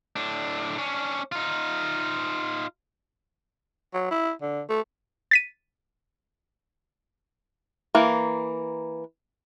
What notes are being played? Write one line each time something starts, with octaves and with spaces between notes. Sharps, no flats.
A2 D4
C#4 D4
D#4 F4
F#3
E4
D3
A3
A6 B6 D#7
E3 A#3